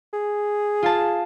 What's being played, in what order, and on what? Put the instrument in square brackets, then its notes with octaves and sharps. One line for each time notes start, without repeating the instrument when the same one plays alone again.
[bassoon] G#4
[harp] F4 A5